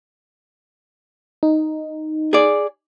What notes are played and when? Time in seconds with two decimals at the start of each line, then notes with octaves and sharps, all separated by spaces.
1.43 D#4
2.33 G#4 D5